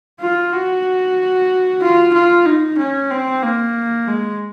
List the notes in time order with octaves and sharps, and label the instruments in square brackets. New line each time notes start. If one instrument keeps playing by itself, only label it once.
[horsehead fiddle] F4
F#4
F4
F4
D#4
C#4
C4
A#3
G#3